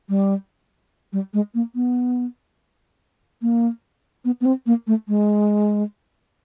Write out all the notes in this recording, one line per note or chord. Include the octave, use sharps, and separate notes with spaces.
G3
G3
G#3
A#3
B3
A#3
B3
B3
C4
A#3
A3
G#3